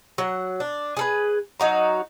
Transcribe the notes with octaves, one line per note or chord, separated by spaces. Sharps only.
F#3 F#5
D4
G#4 A4 B4
F#3 D#4 F#4 A#5